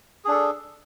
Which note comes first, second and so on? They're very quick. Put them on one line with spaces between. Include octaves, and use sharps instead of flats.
G#4 D4 A4